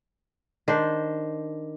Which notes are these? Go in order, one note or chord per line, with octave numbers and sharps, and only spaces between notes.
D#3 D4 C5